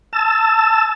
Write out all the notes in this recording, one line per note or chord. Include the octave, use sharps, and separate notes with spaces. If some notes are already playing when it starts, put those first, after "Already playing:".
A5 E6